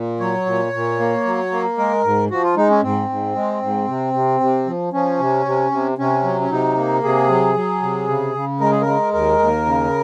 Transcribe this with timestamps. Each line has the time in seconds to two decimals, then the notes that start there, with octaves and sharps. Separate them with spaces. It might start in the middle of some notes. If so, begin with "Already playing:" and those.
Already playing: A#2
0.20 F#3 C#5
0.46 A#2
0.73 A#2
0.99 A#3
1.25 F#3
1.51 A#3
1.78 G#3 A#4
2.04 G#2
2.30 F3 F#4
2.43 F4
2.56 G#3 D#4
2.70 C#4
2.82 G#2 C4
3.09 G#2
3.35 G#3
3.62 G#2
3.87 C3
4.13 C3
4.40 C3
4.67 F3
4.93 F3 C#4
5.19 C3
5.46 C3
5.71 C3
5.98 C3 C#4
6.24 F#3
6.41 C#4
6.50 C3 D#4
6.77 A#3
7.03 C3 G#4
7.29 F#3
7.55 F#3
7.82 C3
8.08 C#3
8.34 C#3
8.60 G#3 A#4
8.71 G#4
8.81 A#4
8.86 G#3
9.13 D#2 A#4
9.39 D#2
9.66 C#3